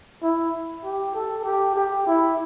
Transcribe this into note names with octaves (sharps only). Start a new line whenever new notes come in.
E4
G4
A4
G4
G4
E4